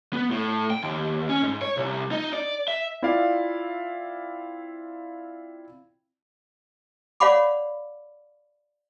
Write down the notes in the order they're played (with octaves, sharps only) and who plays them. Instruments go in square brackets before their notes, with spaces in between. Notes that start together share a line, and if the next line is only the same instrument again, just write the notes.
[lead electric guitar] B3
A2
G5
D#2
C#4
G#2
C#5
C2
D#4
D5
E5
[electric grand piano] C4 E4 F4 D5 F5
[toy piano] C#5 D5 F5 F#5 B5 D6